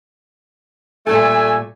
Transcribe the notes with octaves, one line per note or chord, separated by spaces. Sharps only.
A#2 G3 A3 A4 G#5 E6